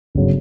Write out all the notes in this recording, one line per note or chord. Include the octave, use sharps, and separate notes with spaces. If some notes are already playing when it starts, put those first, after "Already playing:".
G1 C#3 F#3